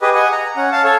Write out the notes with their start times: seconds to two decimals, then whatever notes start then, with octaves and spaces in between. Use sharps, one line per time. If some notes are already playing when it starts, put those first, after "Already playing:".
0.02 G4 G#4 B4 D#5
0.15 D#5 F#5 G#5
0.32 A#5
0.57 C#4 F#5
0.72 F5 A5
0.84 A4 C#5